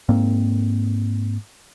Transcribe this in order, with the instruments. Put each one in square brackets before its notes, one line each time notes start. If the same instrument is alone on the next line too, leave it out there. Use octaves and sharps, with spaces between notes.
[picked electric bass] G#2 A#3 C4